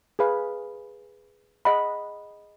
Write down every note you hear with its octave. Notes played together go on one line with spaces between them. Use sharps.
G#4 B4 F5 B5
G#4 D#5 F#5 B5